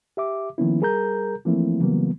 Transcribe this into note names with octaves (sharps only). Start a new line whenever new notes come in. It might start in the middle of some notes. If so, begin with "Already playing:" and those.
G4 E5 D6
D#3 F3 A#3 B3 C#4 E4
G3 G#4 A#4 A#5 G6
E3 F3 A3 A#3 C4 E4
C#3 E3 F#3 G3 A#3 B3